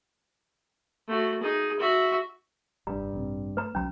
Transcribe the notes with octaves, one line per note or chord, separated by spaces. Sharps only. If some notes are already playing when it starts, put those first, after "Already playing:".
A3 F#4
D#4 G#4
F#4 E5
F1 G2 G3 A#5
A1 C3
A3 B4 A#5
B1 E2 F#3 C#4 A#5